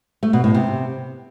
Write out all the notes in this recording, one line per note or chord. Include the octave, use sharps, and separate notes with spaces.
A3
B2
A2
C3